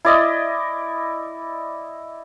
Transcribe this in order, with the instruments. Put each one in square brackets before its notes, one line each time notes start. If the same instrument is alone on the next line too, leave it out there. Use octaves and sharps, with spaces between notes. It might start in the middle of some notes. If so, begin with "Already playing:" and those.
[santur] E4 D5 D#5